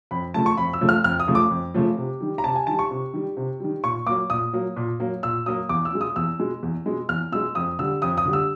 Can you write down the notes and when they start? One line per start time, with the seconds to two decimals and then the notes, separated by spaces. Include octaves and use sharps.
0.11 F2 B5
0.34 C#3 F3 A3 A5
0.46 C#6
0.57 F2 B5
0.73 E6
0.81 C#3 F3 A3
0.89 F6
1.04 F2 F6
1.20 D#6
1.28 C#3 F3 A3
1.35 D6
1.51 F2
1.74 C#3 F3 A3
1.97 C3
2.20 D#3 G3
2.38 A#5
2.44 C3 A5
2.56 G#5
2.67 D#3 G3 A5
2.79 C#6
2.91 C3
3.14 D#3 G3
3.37 C3
3.60 D#3 G3
3.83 A#2 C#6
4.06 F#3 A#3 D6
4.30 A#2 D#6
4.53 F#3 A#3
4.76 A#2
5.00 F#3 A#3
5.23 A#2 E6
5.46 F#3 A#3 D#6
5.69 E2 D6
5.85 E6
5.93 B2 G#3
6.01 D#6
6.16 E2 E6
6.39 B2 G#3
6.63 E2
6.86 B2 G#3
7.09 E2 F6
7.32 B2 G#3 E6
7.55 F2 D#6
7.79 D3 G3 E6
8.02 F2 D#6
8.18 D#6
8.25 D3 G3
8.33 E6